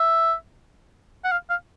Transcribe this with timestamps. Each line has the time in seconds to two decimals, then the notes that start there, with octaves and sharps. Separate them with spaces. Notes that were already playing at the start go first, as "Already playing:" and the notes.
Already playing: E5
1.24 F#5
1.32 F5
1.50 F5